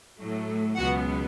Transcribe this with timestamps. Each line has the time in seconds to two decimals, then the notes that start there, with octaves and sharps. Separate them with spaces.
0.18 A2 F#3 A3
0.77 C#2 B2 F#3 B3 F#4 F#5